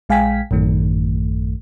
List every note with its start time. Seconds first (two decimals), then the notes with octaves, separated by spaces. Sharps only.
0.09 A#1 G#3 F5 G5 G#5 B6
0.51 A1 F#2 D#3 A3